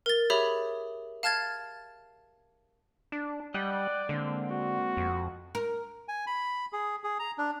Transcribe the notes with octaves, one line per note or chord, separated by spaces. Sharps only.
A#4 A6
G4 G#4 C#5 E5 B5
F5 A5 F6 G#6 A6
D4
G3 D5 D#5 F#5 G5
D3 G#3 A#3 C4
F#4
F2
A#4
G#5
B5
G#4
G#4
A#5
D4